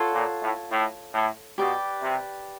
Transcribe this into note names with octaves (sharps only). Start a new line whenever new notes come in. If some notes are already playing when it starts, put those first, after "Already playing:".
Already playing: F4 A4 C#5 F#5
A#2
A2
A2
A2
B2 G4 B4 D5
C3